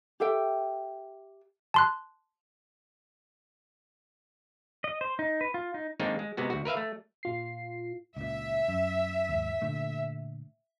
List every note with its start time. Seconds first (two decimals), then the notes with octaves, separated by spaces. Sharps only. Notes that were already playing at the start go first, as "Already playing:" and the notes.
0.20 G4 A4 E5 G5
1.74 A5 C6 F#6
4.84 D#5
5.01 C5
5.19 D#4
5.41 B4
5.54 F4
5.74 D#4
6.00 D#3 G#3 A#3 C4 D4 D#4
6.19 G#3
6.37 C3 G#3 B3 F#4
6.50 D2 F#4
6.65 A#4 B4 E5 F5
6.77 A3
7.23 A#2 F4 C7
8.17 C#2 A#2 E5
8.68 F#2
9.29 D#2 G#2
9.62 A#2 D3 A3